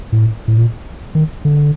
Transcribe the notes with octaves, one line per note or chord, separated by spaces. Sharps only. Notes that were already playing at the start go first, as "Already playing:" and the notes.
A2
A2
A#2
D#3
D3